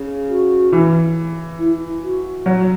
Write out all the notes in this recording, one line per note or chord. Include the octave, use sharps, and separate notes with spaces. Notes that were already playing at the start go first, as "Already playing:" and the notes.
Already playing: C#3
F#4
E3
E4
F#4
F#3